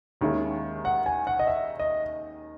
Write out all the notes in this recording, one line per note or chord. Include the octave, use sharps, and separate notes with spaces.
D#2 D#3 G#3 C#4 E4
F#5
G#5
F#5
D#5
E5
D#5